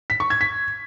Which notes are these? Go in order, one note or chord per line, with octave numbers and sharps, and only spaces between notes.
B6
C#6
G#6
B6